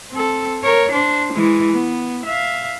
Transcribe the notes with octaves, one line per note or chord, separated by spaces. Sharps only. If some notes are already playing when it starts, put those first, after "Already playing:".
C4 A4
A#4 C#5
D4 C5
E3 G#3
B3
E5 F5